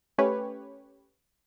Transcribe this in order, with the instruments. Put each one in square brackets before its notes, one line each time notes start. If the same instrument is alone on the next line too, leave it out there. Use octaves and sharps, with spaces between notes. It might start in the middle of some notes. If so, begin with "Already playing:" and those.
[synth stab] A3 C#4 G4 B4 C#5